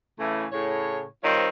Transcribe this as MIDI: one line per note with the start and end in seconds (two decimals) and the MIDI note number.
0.19 0.46 45
0.19 0.46 49
0.19 0.46 52
0.19 0.46 57
0.52 1.04 45
0.52 1.04 49
0.52 1.04 73
1.24 1.48 51
1.24 1.48 55
1.24 1.48 60
1.24 1.48 65
1.24 1.48 72
1.24 1.48 73